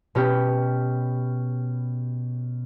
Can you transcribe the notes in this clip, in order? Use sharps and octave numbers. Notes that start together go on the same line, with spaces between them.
B2 C#4 G4